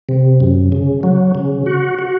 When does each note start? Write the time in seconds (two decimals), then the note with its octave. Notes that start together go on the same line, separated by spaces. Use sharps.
0.09 C3
0.40 F#2
0.72 C#3
1.03 F#3
1.35 C#3
1.66 F#4
1.98 F#4